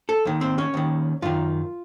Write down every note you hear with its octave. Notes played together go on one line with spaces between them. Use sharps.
A4
D#2 D#3
C4
C#4
D#2 D#3
F#2 D#3 F4